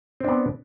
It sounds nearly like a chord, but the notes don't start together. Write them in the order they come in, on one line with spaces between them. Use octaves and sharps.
C4 D4 B3